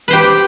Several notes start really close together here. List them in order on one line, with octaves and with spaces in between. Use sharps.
B4 C5 G4